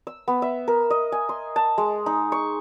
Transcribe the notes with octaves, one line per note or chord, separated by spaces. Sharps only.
E6
B3
E5
A#4
D#5
G#5
C6
A5
G#3
D#4
C#6